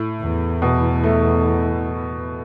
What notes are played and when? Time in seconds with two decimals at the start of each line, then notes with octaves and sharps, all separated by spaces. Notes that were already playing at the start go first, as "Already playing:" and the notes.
Already playing: A2
0.22 E2
0.62 B2
1.04 A3